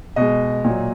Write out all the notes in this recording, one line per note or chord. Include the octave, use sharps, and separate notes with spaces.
B2 G#3 D#5
A#2
F#3